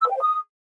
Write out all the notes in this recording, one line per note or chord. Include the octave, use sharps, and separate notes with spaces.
E6
B4
G5
C5
D#6